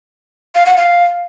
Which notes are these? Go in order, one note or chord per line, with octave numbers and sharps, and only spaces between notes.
F5
F#5
F5